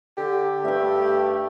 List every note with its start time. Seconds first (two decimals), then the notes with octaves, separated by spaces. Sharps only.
0.18 D3 G4
0.65 G2 A3 E5 G5